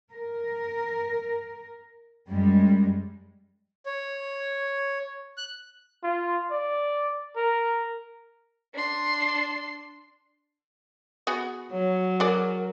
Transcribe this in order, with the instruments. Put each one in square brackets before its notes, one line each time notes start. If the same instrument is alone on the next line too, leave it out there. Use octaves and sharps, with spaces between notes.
[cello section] A#4
F#2 G3 G#3
[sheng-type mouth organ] C#5
F#6
[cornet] F4
D5
A#4
[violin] D4 C6
[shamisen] B3 F#4 G#4
[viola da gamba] F#3 [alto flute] C#5
[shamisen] F#4 G#4 D5 [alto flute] A#4